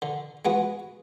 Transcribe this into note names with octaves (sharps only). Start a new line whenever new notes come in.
D3
G#3 B3 F#4